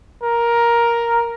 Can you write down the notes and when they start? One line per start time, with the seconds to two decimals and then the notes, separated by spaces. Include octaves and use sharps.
0.23 A#4